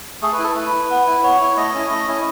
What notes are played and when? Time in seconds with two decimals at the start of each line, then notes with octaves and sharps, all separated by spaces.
0.22 A3 G#4
0.32 B4
0.38 E4
0.44 A4
0.55 A3 B4
0.72 E4
0.90 B3
1.07 E4
1.23 B3 C#5
1.40 E4
1.57 A3 D#5
1.74 C#4 E4
1.90 A3
2.08 C#4 E4